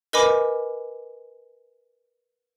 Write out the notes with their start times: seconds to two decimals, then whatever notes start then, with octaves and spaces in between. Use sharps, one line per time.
0.13 A#4 B4 D#5 G#5 B5 D6